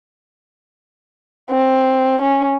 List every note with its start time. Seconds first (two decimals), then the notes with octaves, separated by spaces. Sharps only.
1.50 C4
2.21 C#4